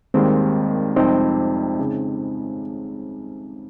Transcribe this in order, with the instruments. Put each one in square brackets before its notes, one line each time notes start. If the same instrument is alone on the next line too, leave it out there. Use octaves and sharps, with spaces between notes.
[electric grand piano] D#2 D#3 G3 A#3 [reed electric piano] G#3 C4
[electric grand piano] F2 C3 G3 [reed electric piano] C4 D#4
[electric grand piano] C#3